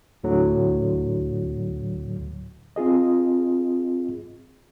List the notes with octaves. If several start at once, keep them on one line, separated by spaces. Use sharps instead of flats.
D2 A2 D3 F#3
C4 F4 G#4 D#5